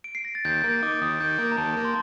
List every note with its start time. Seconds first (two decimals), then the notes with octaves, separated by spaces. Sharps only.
0.04 D7
0.15 C7
0.25 A#6
0.35 A6
0.45 D#2 G6
0.64 A#3 G6
0.83 D#4 D6
1.02 D#2 D#6
1.20 D#3 G6
1.38 A#3
1.52 A#5
1.57 D#2 A5
1.77 A#3
1.85 C6